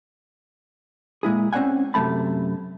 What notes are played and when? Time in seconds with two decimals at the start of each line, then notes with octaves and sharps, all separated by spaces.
1.23 A#2 G#3 E4 G#4
1.53 C4 C#4 C5 D5 F#5 G#5
1.94 F#2 C3 A3 A5 B5